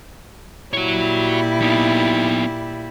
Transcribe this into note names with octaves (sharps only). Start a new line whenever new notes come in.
A#2 G3 E4 F#4 C#5
B3 D#4